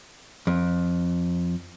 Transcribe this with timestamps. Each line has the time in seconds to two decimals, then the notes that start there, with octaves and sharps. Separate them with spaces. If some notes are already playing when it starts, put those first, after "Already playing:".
0.47 F2